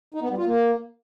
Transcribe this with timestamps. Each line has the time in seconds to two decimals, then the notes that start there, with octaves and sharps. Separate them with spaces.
0.14 D#4
0.22 B3
0.30 G3
0.38 F4
0.46 A#3